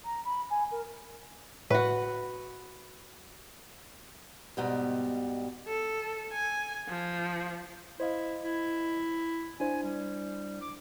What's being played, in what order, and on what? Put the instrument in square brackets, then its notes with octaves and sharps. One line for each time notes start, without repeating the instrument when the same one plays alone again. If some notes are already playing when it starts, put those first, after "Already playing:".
[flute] A#5
B5
G#5
A#4
[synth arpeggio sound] A2 [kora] F#4 B4
[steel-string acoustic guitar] G#2 B2 G3
[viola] A4
G#5
F3
[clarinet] E4 [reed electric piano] C5 D#5 F5
[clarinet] E4
[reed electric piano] D4 E4 C5 [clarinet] G#5
[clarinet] G3
D6